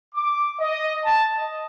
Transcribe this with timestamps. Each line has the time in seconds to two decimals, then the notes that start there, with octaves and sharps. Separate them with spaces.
0.15 D6
0.60 D#5
1.04 A5
1.34 D#5